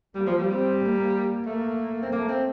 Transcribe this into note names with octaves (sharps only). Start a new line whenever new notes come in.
G3 A#3
F3
G3
C4
A#3
A3 A#3
C4
A3 A#3
C4